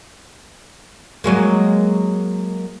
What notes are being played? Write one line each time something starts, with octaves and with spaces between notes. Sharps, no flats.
F#3 G#3 A#3